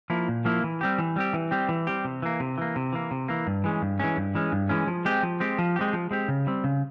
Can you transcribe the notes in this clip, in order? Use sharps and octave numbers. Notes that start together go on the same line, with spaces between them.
F3 A#3 E4
A#2
F3 A#3 E4
E3
G3 C4 G4
E3
G3 C4 G4
E3
G3 C4 G4
E3
G3 C4 G4
C3
E3 A#3
C3
E3 A#3
C3
E3 A#3
C3
E3 A#3
G2
E3 G#3 C#4
G2
E3 G#3 C#4
G2
E3 G#3 C#4
G2
E3 G#3 C#4
F3
G#3 C4 G4
F3
G#3 C4 G4
F3
G#3 C4 G4
F3
G#3 C4 G4
C#3
G3 C4
C#3